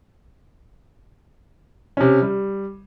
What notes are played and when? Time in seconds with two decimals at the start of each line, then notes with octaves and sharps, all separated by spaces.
1.97 C3 C#4
2.22 G3